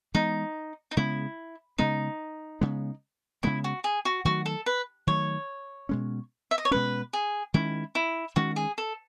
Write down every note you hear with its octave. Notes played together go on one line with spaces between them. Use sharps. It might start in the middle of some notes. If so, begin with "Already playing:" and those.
E3 G#3 B3 D#4
D#4
C#3 G#3 B3 E4
C#3 G#3 B3 D#4
C#3 G#3 B3
C#3 G#3 B3 E4
F#4
G#4
F#4
D#3 F#3 A3 F#4
A4
B4
D#3 F#3 A3 C#5
B2 G#3 C#4
E5
D#5
C#5
B2 G#3 C#4 B4
G#4
D#3 G#3 C#4 E4
E4
D#3 G#3 C#4 F#4
G#4
A4